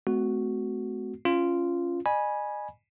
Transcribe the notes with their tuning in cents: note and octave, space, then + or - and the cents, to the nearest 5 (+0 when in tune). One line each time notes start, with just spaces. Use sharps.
A3 -35 C4 -45 F#4 +0
C#4 +0 F4 -10
D#5 -40 G#5 +0 B5 -25